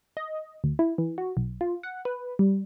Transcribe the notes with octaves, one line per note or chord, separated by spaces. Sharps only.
D#5
D2
E4
E3
F#4
B1
F4
F#5
B4
G3